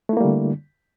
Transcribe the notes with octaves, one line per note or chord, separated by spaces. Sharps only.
D3 G3 A3 A#3 E4